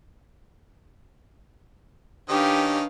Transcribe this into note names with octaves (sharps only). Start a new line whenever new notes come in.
D#3 C#4 D4 G4 B4 D#5 F5